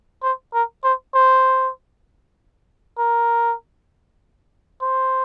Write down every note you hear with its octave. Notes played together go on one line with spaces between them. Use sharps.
C5
A#4
C5
C5
A#4
C5